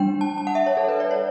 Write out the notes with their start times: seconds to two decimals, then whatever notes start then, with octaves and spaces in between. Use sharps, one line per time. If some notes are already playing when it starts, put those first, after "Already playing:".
Already playing: G3 D4 G5
0.21 A5
0.38 A5
0.47 F#5
0.55 E5
0.66 C#5
0.77 A4
0.88 B4
1.00 D5
1.11 C#5